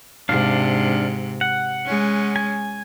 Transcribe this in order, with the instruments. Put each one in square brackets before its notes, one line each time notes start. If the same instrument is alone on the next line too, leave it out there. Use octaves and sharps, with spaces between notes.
[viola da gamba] G#2 C3 [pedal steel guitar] D4 F5
[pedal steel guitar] F#5
[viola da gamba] G#3 C#4
[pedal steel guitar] G#5